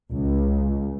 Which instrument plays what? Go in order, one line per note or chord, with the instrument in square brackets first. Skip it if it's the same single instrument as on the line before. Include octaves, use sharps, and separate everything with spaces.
[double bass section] C#2